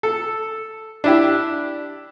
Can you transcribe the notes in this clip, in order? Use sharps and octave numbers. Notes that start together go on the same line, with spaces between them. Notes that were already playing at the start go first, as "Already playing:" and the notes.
A4
D4 E4 G4